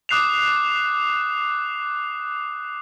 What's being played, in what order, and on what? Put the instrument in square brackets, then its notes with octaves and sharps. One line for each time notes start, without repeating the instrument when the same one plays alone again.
[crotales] D6 D#6 F#6 C7 E7 F7